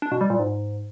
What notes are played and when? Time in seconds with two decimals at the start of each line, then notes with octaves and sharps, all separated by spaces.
0.02 D4
0.12 B2
0.21 G3
0.30 A#2
0.39 G#2